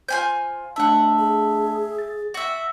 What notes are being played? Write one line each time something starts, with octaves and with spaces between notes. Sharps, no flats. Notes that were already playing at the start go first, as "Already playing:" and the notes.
F4 C5 G#5 G6
A3 D4 E5 F#5 A5
G#4
A6
F#4 E5